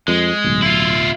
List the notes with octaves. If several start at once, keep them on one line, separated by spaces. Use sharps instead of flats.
F2 G#3
D1 B1
E4 F4